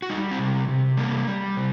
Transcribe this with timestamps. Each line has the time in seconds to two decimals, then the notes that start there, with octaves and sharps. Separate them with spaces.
0.02 F#4
0.10 G3 D#4
0.31 C4
0.39 C3
0.68 C3
0.97 G3 A#3
1.27 G3
1.57 C3